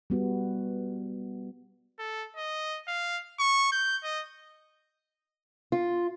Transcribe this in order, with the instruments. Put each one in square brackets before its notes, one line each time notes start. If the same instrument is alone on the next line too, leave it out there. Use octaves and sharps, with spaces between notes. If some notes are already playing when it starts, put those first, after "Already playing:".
[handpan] G3 B3 F#4
[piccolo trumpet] A4
D#5
F5
C#6
G6
D#5
[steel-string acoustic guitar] F4